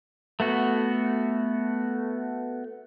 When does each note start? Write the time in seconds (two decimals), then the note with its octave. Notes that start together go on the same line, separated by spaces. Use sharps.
0.40 A3 B3 F#4